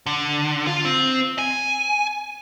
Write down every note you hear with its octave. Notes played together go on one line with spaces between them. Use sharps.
D3
F4
C4
G#5